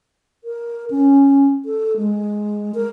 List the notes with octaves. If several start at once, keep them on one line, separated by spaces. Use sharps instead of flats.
A#4
C#4
A4
G#3
A#4